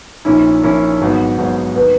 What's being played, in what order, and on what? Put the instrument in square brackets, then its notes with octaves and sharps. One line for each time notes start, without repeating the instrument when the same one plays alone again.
[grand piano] A#1 A#2 A#3 C#4 E4 [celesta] D#4
[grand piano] A#1 A#2 A#3 C#4 E4
G#1 G#2 F#3 B3 F#4
G#1 G#2 F#3 B3 F#4
[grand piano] D#3 A#3 [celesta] B4